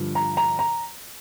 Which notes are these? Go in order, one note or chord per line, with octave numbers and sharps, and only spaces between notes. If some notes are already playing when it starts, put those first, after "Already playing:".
Already playing: G2 D3 F3
A#5
A#5
A#5